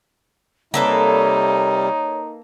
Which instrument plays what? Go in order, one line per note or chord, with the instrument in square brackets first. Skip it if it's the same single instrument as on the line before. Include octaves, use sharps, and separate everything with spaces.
[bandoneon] C3 G3 [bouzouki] A#3 A4 B4 [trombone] D#4 [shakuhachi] C#5